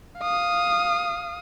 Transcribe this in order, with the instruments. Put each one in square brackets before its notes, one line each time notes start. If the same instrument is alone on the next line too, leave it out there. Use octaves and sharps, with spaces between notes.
[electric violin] F5 D#6